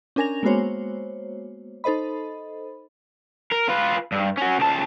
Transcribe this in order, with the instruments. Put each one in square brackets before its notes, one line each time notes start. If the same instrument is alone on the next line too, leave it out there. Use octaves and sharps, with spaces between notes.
[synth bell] C#4 D4 A#4 G#5 A#6 F7
G#3 A#3 B3 F#4 C5 C#5
D#4 A4 C5 D#5 B5
[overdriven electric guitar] A#4
F4 B4
G2
C#4 F#4
C#2 A5